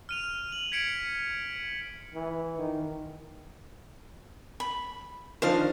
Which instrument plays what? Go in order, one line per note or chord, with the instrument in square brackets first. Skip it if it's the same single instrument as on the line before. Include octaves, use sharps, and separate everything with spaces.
[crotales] F6 D#7 F7
F#7
G#6 B6 C#7 D7
[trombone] E3
D#3
[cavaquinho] B5
[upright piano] D#3 F3 D4 [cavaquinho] C5 F5